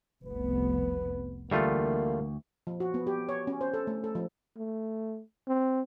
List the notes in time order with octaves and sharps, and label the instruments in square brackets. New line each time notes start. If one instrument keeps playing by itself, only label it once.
[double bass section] F1 C2 B3 [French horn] B4
[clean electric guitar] D2 [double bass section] E3 [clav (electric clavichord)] G3 A3 F4 [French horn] A#3
[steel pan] F3
F#4
B3
G4
C#5
C#4
C5
A4
A3
A4
F3
[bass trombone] A3
C4